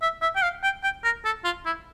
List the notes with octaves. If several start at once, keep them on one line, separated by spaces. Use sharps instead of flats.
E5
E5
G5
F5
G5
G5
A#4
A4
F4
E4